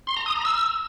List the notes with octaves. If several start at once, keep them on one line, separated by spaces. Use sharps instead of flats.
C6
A#5
D#6
A#5
E6